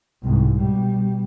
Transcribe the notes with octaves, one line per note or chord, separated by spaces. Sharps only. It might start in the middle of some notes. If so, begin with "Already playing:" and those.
C2 G#2
B2 G3